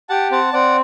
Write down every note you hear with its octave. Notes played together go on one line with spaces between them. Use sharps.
G4 F#5 A5
C4 F#5 A5
C4 D5 F#5